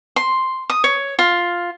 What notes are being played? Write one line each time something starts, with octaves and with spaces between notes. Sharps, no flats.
C6
D#6
C#5
F4